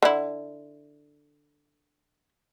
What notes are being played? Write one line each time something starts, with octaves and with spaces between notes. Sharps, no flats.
D3 E4